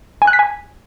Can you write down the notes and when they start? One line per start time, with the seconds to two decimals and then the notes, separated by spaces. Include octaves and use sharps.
0.22 G#5
0.27 F#6
0.33 B6
0.39 G#5